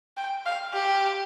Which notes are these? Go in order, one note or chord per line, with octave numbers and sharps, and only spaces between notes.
G5
F5
G4